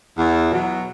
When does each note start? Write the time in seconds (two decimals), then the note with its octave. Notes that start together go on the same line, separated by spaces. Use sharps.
0.18 E2
0.51 B2 F#3